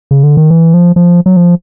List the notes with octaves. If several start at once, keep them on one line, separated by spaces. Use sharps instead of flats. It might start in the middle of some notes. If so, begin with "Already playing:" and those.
C#3
D3
D#3
E3
F3
F3
F#3
F3